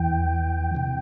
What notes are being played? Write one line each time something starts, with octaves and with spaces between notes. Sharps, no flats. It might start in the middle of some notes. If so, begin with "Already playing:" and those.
Already playing: E2 E3 G5
C3 E3